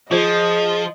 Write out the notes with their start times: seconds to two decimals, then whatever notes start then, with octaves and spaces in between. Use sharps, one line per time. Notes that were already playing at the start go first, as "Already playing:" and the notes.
0.11 F3 F4 G#4 C5 D#5